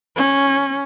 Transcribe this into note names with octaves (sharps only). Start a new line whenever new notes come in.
C#4